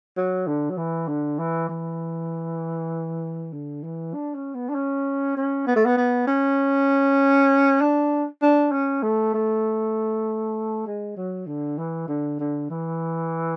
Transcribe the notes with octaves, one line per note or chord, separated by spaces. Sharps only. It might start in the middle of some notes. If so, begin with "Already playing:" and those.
F#3
D3
F#3
E3
D3
E3
E3
D3
E3
D4
C#4
B3
D4
C#4
C#4
B3
A3
B3
B3
C#4
D4
D4
C#4
A3
A3
G#3
F#3
D3
E3
D3
D3
E3